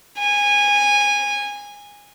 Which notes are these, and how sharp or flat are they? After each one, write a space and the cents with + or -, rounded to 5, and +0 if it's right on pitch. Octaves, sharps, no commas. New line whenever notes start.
G#5 -20